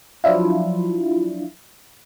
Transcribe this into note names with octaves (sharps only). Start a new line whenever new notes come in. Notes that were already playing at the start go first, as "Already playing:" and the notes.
F3 F#3 D4 E4 F4